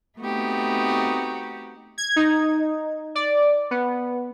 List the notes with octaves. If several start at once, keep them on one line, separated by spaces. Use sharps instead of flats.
A3 B3 C4 D#4 F#4 G4
G#6
D#4
D5
B3